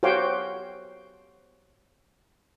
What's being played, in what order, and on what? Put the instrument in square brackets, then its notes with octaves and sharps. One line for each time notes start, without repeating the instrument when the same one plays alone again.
[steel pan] F#4 G4 C5 C#5 F5 G5